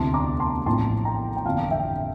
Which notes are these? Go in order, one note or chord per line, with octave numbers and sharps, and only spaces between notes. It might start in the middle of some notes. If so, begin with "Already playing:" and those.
Already playing: E1 D2 C3 E3 A5 C6
A#5 D6
A5 C6
A#1 A2 F3 C4 A5 C6
G5 A#5
G5
G1 F2 E3 A#3 D4 F5 A5
E5 G5